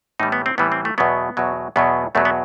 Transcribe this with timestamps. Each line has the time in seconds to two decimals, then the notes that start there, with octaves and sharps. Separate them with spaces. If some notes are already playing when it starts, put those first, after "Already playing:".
0.20 A2 E3 G3 D#4
0.32 B3
0.46 C4
0.58 A2 E3 G3 B3
0.72 C4
0.85 A3
0.98 E2 B2 F#3 B3
1.37 E2 B2 F#3
1.76 E2 B2 F#3 B3
2.15 E2 B2 F#3 A3
2.25 B3